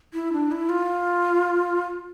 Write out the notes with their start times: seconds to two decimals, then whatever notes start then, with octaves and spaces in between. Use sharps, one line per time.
0.14 E4
0.33 D4
0.52 E4
0.69 F4